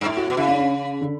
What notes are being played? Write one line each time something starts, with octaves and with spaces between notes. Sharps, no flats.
G2
A2 E4
F#4
B2 F#4
C#3 E4
D4
C#4
D3